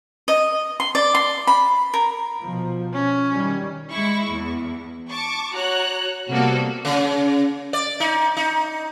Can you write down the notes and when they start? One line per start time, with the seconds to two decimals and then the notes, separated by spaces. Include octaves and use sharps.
0.28 D#5
0.80 C6
0.95 D5
1.15 C6
1.47 B5
1.94 A#4
2.43 B2 F3
2.94 C#4
3.32 D#3 G3
3.91 G#3 E4 C#6
4.30 E2
5.10 A5 C#6 D6
5.53 F#4 C#5 A#5 F#6
6.30 C3 G3 A#3 B3 F#4 A4
6.85 C#3
7.73 D5
8.00 D#4
8.37 D#4